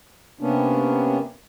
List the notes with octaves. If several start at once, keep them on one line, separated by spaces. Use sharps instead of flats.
C3 A#3 B3 C#4 D4